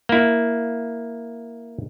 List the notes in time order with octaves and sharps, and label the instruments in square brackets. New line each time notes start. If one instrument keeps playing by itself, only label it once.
[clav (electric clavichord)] A#3 E4